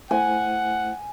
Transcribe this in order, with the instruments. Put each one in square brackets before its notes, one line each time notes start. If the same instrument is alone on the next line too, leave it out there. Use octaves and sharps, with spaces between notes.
[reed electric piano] A3 E4 C5 [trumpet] F#5 [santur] G#5